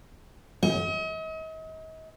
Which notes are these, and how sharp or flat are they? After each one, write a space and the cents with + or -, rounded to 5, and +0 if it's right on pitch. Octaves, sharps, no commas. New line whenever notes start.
D#5 +40